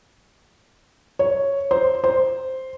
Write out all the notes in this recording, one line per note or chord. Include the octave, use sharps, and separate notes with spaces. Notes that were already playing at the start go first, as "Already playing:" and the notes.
C#5
C5
C5